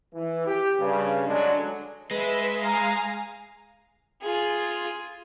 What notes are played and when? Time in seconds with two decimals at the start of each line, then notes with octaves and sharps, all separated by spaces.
0.14 E3
0.46 G4
0.79 G2 C#3
1.26 D3 F#3 G#3 D4
2.11 G#3 B4 E5
2.59 F5 G#5 A#5
4.21 F4 G#4